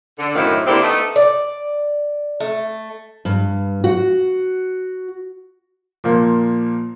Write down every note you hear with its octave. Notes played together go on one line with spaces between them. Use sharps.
D3
F#2 A2 D#3 C4 E4 F5
D3 A#3 C4 D4 E4 G4
A3 B3 D#4
D5
A3
G2
F#4 F#5
A#2 F3 A#3